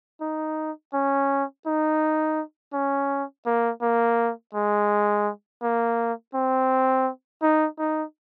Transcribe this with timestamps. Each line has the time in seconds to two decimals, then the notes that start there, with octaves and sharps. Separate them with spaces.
0.21 D#4
0.94 C#4
1.66 D#4
2.73 C#4
3.46 A#3
3.81 A#3
4.54 G#3
5.62 A#3
6.35 C4
7.42 D#4
7.79 D#4